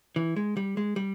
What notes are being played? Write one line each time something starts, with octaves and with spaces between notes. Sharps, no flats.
E3
G#3
G3
G#3
G3